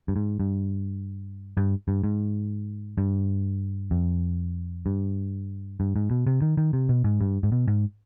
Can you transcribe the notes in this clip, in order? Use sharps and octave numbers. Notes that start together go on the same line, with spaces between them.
G2
G#2
G2
G2
G2
G#2
G2
F2
G2
G2
G#2
B2
C3
D#3
D#3
C3
B2
G#2
G2
G#2
B2
G#2